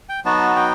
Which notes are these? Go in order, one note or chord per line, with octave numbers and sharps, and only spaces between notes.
G5
F#3 B3 D#4 F#4 A5
A5
G5